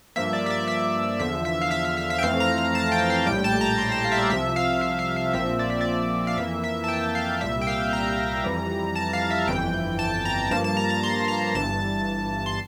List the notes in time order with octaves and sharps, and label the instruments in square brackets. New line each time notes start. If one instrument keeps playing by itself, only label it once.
[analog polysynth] G2 F3 A#3 E5
D5
E5
D5
E5
E2 D3 F3 E5
E5
F5
E5
E5
E5
E5
G5
F2 E3 A3 C4 F5
A#5
A#5
A5
G5
F5
A#1 A2 G3 G5
A5
A#5
C6
A5
F5
E5
D5
C2 C3 F3 E5
F5
F5
F5
F5
A#1 A#2 F3 C4 E5
D5
E5
D5
F5
F2 E3 A#3 E5
E5
A5
G5
F5
C2 A#2 G3 E5
G5
F5
A#5
F2 E3 G3
A5
F5
E5
G1 F2 E3 G5
A5
A#5
G2 F3 A#3 A5
A5
A#5
A#5
C6
A#5
G1 G2 E3 A5
C6